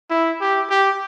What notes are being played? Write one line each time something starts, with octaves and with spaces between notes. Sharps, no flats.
E4
G4
G4